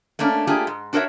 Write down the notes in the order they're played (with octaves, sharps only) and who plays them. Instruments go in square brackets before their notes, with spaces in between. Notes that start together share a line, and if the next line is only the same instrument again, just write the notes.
[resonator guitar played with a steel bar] A3 A#3 C#4 D4
A3 A#3 D4 F4 G4 G#4
G#2
D4 F#4 A#4 C5 C#5 E5